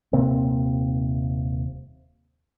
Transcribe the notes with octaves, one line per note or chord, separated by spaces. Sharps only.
D#1 C3 A#3 C4